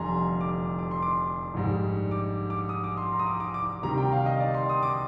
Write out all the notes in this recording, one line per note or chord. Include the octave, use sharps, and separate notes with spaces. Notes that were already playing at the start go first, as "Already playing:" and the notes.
Already playing: F1 F2 D3 G3 G#5 A#5 C6
D6
D6
C6
D6
A#1 G#2 G3
D6
D6
D#6
D6
C6
A#5
D#6
D6
D6
D6
D2 C3 D#3 G3 A#5
G5
F5
D#5
D5
C6
D#6
D6